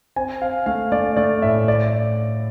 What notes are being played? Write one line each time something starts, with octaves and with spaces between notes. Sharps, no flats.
C4 G#5
C4 F5
A3 F5
A3 D5
A3 D5
A2 E5
D5